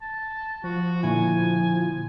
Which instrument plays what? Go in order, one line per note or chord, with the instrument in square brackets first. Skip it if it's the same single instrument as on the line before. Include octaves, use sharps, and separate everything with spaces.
[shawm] A5
[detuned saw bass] F3 [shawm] F#4
[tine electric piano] A#2 D3 E4 [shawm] G#5